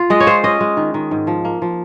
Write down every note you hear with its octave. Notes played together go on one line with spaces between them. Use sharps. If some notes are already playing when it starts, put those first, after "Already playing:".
Already playing: F4
G#3 D#5
C#5
F4 C5
C#4 D#5
G#3
D#3
D#3
G#2
F3
A#3
F3